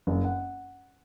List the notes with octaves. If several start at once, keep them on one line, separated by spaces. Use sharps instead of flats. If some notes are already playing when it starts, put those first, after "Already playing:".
F#1
F#5